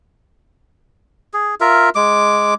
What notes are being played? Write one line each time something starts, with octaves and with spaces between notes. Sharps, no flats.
G#4
F4 A#4 E5
G#3 D6